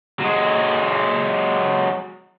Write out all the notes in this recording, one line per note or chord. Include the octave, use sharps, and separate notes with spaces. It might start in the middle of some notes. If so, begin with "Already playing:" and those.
F#3 G#3